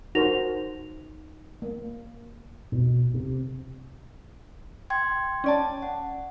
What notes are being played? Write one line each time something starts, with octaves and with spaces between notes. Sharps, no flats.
D#4 F#4 A#4 C5 A#6 F7
A#3
B2
C3
G5 C6 G#6
C#4 D5 A5
F#5